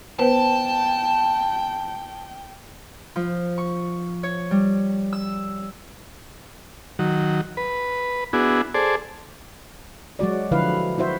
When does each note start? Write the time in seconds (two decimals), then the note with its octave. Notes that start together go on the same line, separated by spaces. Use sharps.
0.19 B3 B4 C5 G5 A5
3.16 F3
3.58 C#6
4.23 C#5
4.51 G3
5.13 E6
6.99 D#3 F#3
7.57 B4
8.33 B3 D4 E4 F#4 G#4
8.74 G#4 A4 C5 D5
10.19 F#3 G#3 F#4 D5
10.51 D3 F3 E4 B4 F5
10.98 E4 F#4 C5 E5